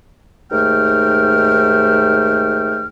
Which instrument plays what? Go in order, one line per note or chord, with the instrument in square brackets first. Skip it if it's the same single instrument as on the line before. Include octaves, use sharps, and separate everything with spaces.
[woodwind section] D#2 G#2 A3 G5 F6